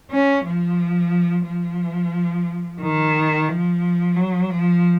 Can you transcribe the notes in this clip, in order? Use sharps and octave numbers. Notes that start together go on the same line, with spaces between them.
C#4
F3
F3
D#3
F3
F#3
F3